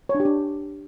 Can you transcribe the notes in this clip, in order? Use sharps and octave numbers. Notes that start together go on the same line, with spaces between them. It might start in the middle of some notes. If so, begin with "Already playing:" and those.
C#5
D4
G4
D4